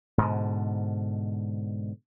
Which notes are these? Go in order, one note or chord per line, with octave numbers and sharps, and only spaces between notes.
G#2 B2 D3